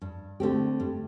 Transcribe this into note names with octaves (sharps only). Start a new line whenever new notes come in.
G2
D3 A3 C4 G4
G2